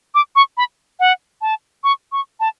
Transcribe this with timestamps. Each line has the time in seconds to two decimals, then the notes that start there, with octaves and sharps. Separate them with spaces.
0.15 D6
0.36 C#6
0.57 B5
1.00 F#5
1.41 A5
1.84 C#6
2.12 C#6
2.40 A5